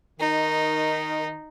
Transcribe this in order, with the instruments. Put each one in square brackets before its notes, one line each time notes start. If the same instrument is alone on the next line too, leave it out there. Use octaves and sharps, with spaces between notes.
[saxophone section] D#3 [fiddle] D#4